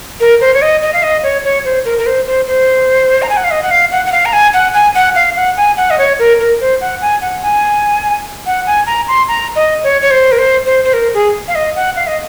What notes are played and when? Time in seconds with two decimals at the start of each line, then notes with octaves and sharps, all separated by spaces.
0.20 A#4
0.41 C5
0.54 C#5
0.62 D#5
0.82 D#5
0.93 F5
1.03 D#5
1.23 C#5
1.44 C#5
1.65 C5
1.85 A#4
1.99 A#4
2.06 C5
2.27 C5
2.47 C5
3.22 A#5
3.30 G#5
3.37 F#5
3.44 F5
3.51 D#5
3.63 F#5
3.71 F5
3.92 F#5
4.06 F#5
4.12 F5
4.25 A#5
4.33 G#5
4.54 F#5
4.74 G#5
4.95 F#5
5.15 F5
5.36 F#5
5.57 G#5
5.77 F#5
5.90 D#5
5.98 C#5
6.19 A#4
6.40 A#4
6.61 C5
6.81 F#5
7.01 G#5
7.21 F#5
7.42 G#5
8.46 F#5
8.67 G#5
8.87 A#5
9.08 C6
9.28 A#5
9.56 D#5
9.83 C#5
10.01 C#5
10.11 C5
10.32 A#4
10.38 C5
10.66 C5
10.84 C5
10.93 A#4
11.14 G#4
11.48 F5
11.55 D#5
11.76 F#5
11.96 F5
12.07 D#5